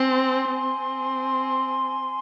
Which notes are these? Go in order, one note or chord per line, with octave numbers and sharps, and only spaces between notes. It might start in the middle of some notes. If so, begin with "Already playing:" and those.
Already playing: C4 G#5 C6
C4